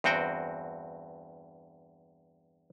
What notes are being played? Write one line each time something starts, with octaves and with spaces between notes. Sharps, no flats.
E2 G2 C4 F#4 G5